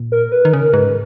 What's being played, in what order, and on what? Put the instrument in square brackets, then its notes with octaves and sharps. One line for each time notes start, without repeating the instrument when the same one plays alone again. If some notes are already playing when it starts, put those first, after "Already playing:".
Already playing: [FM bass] A#2
[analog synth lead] A#4
B4
[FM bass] D#3
[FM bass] C#3 [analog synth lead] A#4
[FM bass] G#2 [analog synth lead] B4